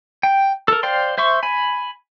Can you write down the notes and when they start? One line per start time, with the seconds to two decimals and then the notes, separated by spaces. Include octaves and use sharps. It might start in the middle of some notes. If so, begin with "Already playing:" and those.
0.23 G5
0.68 A4 A#4
0.83 C5 D5 F5 G5 C6
1.18 C5 E5 C6 C#6
1.43 G#5 B5